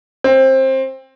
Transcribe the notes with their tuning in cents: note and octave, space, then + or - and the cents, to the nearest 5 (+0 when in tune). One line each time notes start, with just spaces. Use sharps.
C4 +20